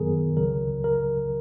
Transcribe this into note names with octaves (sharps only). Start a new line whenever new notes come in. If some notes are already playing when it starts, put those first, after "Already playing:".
Already playing: F#2 D#3 F#3 B3 G#4 A#4
C#2 C#3 F#3 A#4
A#4